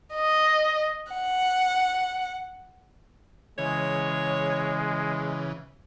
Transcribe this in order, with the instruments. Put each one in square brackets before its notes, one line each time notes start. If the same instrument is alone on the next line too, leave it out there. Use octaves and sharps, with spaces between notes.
[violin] D#5
F#5
[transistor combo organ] C#3 E3 [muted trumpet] G#3 [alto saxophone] C#5